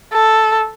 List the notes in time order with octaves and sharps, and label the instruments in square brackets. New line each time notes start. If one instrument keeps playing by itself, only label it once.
[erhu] A4